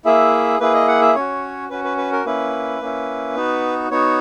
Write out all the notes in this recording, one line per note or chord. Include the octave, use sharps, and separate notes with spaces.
A#3 E4 G#4 E5
A#3 E4 G#4 B4
D#5
F#5
E5
C#4 F#4 C#5
C#4 F#4 B4
B4
B4
A#4
A#3 C#4 E4 B4
A#3 C#4 E4
B3 D#4 F#4
B3 D#4 F#4 C#5